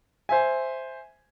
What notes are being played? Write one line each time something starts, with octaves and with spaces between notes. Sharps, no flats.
C5 E5 G#5